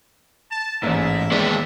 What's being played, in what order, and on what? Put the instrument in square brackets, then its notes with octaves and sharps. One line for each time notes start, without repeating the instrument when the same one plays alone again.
[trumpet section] A5
[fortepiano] A1 A#3 [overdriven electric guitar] G#2 G#3 [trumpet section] E5
[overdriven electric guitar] D#2 [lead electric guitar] G#3 B3 [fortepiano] D5